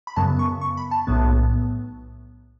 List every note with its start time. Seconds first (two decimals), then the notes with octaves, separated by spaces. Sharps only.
0.07 B5
0.16 F#2 C#3 F#3 B3 A5
0.39 C#6
0.61 C#6
0.77 B5
0.91 A5
1.07 B1 A2 F#3 B3